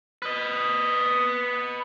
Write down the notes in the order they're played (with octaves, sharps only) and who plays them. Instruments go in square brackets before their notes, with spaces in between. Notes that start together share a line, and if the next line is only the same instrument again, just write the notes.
[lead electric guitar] B4 D#5